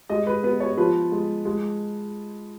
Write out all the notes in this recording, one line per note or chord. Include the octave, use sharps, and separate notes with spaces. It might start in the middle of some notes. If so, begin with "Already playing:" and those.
G#3 D#5
B4
B3 B4
C#5
F3 B4
G#3
G#3